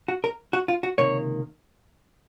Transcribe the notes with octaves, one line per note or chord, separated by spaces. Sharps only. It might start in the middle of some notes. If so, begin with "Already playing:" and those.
F#4
A#4
F#4
F4
F#4
C#2 C3 D#3 A#3 C#5